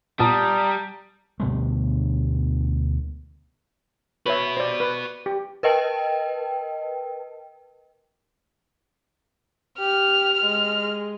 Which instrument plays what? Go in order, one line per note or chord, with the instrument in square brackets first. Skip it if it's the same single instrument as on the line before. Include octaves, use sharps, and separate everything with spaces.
[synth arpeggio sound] A#2 B3 [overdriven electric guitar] G3 [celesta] A5 D#6 [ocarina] A#5
[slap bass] D2 B2 G3 A3
[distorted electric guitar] F#4 B5 [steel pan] B4 C#5 E5
[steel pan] C5 D5
B4
G4
[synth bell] A#4 B4 D#5 G5 A5
[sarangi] G4 [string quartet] F6
[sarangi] G#3